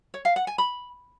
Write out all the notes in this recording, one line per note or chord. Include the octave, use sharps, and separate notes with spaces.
C#5
F5
F#5
G#5
B5